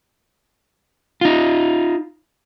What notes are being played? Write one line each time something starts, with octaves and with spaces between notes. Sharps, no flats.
D#4 F4